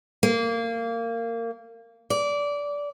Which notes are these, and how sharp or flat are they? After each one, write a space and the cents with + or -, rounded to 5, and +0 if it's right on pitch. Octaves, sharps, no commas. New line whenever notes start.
A#3 -20
D5 -20